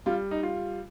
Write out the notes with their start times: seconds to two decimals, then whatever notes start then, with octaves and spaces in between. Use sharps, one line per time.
0.06 G3 F4
0.31 D#4
0.43 F4